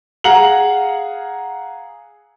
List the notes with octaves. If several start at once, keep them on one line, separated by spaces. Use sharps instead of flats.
G#4 F5 F#5 A#5 F#7